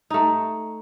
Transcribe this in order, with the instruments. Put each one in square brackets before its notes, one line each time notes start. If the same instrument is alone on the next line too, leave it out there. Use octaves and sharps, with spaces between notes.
[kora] A3 D#4